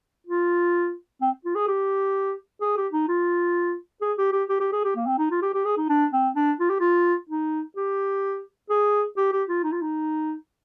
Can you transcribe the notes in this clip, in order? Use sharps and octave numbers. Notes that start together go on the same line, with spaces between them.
F4
C4
F4
G#4
G4
G#4
G4
D#4
F4
G#4
G4
G4
G4
G4
G#4
G4
A#3
C4
D#4
F4
G4
G4
G#4
D#4
D4
C4
D4
F4
G4
F4
D#4
G4
G#4
G4
G4
F4
D#4
F4
D#4